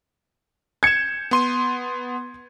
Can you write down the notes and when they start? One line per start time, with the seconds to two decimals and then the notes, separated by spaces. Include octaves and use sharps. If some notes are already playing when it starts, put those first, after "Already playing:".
0.83 G6 G#6 C#7 E7
1.31 B3 C6 D#7